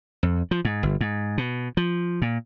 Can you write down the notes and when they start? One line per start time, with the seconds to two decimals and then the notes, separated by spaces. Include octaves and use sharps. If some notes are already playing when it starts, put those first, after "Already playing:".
0.23 F2
0.51 F3
0.65 G#2
0.83 G1
1.01 G#2
1.38 B2
1.77 F3
2.22 A#2